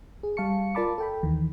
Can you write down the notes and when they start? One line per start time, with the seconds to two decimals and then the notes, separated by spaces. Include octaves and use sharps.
0.23 G#4
0.37 G3 F5 A5 C#6 C#7
0.75 F4 A#4 D5 A5 B5 D6
0.98 A4 G5 B5
1.23 D#2 D#3 E3